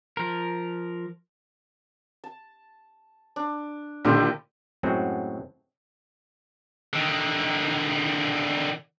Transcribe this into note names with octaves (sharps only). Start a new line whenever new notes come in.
F3 A#4
A5
D4
A#1 D3 D#3 E4 G4 C6
F#2 A2 F#3 G#3 C4 F#4
D3 D#3